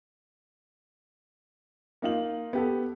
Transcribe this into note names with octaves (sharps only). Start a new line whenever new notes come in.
A#3 D#4 F4 F#7
B3 G4 A4